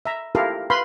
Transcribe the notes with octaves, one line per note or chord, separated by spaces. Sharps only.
E5 A#5
E4 F4 G4 A4 A#4 F5
B4 F5 B5 C6